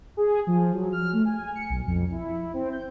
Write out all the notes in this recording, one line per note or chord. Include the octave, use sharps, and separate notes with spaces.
G#4
F3
F#3
F6
A3
G#5
C#7
B1
F2
E4
C4
G6